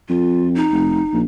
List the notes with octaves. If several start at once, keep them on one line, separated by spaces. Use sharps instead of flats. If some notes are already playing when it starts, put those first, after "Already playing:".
F2 F4
D#4
F1
A#1